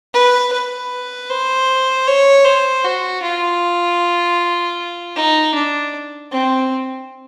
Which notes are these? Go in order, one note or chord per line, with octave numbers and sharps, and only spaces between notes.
B4
B4
C5
C#5
C5
F#4
F4
D#4
D4
C4